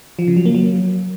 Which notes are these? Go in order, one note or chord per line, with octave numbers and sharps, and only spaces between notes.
F3
C#3
F#3
A#3
F#3